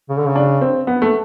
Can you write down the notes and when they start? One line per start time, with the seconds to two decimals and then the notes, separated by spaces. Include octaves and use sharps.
0.09 C#3
0.18 D3
0.28 C#3
0.35 D4
0.61 C4
0.87 B3
1.02 A3